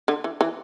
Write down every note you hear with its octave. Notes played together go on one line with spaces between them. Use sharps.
D3
E3
E3